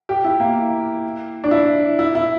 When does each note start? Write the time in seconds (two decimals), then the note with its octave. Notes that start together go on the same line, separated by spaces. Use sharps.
0.09 G4
0.24 E4
0.40 A#3
1.44 D4
1.51 E4
1.99 E4
2.15 E4